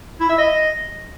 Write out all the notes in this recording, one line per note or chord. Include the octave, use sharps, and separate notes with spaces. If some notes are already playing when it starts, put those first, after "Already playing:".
E4
E5
D#5